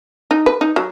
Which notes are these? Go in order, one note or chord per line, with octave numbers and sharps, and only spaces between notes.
D#4
B4
D#4
F#3